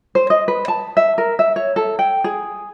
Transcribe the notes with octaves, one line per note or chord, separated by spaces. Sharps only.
C5
D#5
B4
A5
E5
A#4
E5
C#5
A4
G5
G#4